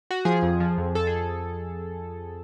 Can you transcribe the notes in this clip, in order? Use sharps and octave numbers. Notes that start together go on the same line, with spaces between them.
F#4
F3 G#4
F2
F3
F2
F2 A4
G#4